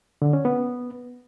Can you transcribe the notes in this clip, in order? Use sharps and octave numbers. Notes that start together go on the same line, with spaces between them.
D3
C#4
B3